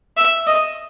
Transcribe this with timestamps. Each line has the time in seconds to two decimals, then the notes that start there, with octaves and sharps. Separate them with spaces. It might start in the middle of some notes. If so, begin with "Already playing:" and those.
0.17 E5
0.47 D#5